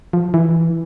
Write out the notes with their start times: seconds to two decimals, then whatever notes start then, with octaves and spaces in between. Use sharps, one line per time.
0.13 F3
0.34 E3